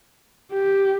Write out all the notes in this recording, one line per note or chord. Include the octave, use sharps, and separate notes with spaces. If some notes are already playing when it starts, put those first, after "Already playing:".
G4